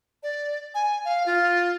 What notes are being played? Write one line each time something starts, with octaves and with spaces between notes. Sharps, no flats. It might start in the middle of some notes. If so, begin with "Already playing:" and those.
D5
G#5
F5
F4